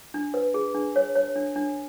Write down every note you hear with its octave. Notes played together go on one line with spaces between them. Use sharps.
D4
B4
G#4
D4
C#5
C#5
D4
D4